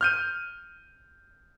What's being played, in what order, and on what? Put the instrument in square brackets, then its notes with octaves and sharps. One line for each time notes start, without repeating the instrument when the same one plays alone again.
[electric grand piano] F6 G6 D#7